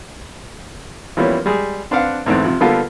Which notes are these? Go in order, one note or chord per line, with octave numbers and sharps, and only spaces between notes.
E3 F3 G3 A#3 B3 C#4
G3 G#3 G#4
C4 D4 B4 F5 F#5
E2 G#2 E3 A3 C4
C3 F3
D3 G3 A#3 B3 F4 A4